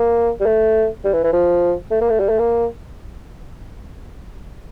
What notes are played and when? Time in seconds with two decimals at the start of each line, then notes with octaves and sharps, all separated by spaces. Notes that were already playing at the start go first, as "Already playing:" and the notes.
Already playing: A#3
0.40 G3
0.46 A3
1.04 G3
1.13 E3
1.24 E3
1.33 F3
1.91 A3
2.01 A#3
2.10 A3
2.20 G3
2.29 A3
2.39 A#3